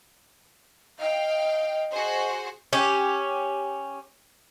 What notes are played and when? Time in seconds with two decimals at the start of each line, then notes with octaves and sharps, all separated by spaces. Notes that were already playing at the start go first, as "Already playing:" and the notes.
0.99 D#5 F5 G5
1.91 F#4 G#4 C5
2.73 C#4 G4